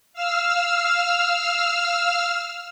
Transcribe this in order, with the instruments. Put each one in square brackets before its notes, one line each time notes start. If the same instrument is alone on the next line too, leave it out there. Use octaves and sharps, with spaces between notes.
[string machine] F5 E6 F6